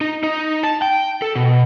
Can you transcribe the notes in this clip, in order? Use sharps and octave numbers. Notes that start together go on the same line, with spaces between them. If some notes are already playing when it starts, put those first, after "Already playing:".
D#4
D#4
A5
G5
A4
B2